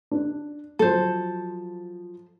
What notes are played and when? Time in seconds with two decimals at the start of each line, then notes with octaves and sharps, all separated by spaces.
0.11 D4
0.79 F3 F#3 A4 C5